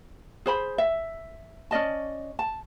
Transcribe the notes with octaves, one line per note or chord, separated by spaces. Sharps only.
G#4 C5 B5
E5
C#4 D5 D#5 A5
A5